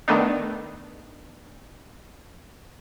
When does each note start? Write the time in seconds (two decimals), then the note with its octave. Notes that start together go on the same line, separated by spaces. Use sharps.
0.08 D#3 A3 B3 D4 D#4